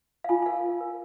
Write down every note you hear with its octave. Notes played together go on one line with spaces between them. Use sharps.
F5
F4 G#5
G#5
A#4 F5
F4
A#4